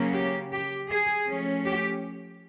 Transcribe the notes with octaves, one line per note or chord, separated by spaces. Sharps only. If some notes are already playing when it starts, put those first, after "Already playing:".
Already playing: C#3 F#3 A#3 C#4
G4
G4
G#4
F3 A3 C#4
G4